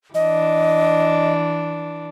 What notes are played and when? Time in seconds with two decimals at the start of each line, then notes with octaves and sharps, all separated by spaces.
0.15 E3 D4 D#5